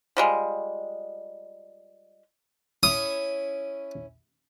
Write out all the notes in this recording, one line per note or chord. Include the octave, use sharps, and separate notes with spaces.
F3 G3 G#3
C#4 E4 C#5 D#6